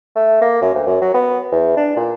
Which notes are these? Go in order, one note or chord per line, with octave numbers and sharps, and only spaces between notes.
A3
A#3
F#2
D2
F#2
F#3
B3
E2
D4
A#2